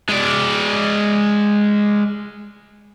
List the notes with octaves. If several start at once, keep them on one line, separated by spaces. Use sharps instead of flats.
G#3 D5